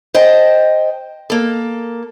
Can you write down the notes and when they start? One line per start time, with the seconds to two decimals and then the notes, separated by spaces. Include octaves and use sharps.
0.14 C5 D#5 G5 A5
1.30 A#3 A4